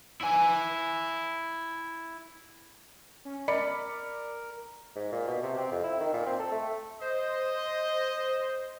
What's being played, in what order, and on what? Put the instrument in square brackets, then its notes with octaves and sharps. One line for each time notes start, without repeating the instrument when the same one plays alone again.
[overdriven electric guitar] E4 G#5
[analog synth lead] C#4
[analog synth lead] A#4 [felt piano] D5 B5 C#7
[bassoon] G#2
A#2
B2
C3
C4
F2
E4
D#3
A#2
C4
A4
A3
[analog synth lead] C5 [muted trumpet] D#5